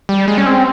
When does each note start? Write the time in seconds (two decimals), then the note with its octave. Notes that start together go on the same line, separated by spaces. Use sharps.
0.09 G3
0.28 G#3
0.38 C#4
0.46 C4